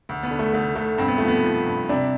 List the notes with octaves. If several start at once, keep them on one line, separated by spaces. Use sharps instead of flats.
D2
B3
D3
A3
D2 A3
D2 A3
G2 C4
B3
F3 A3
B3
F3
G2
C3 D4